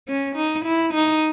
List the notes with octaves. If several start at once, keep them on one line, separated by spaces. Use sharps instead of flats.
C#4
D#4
E4
D#4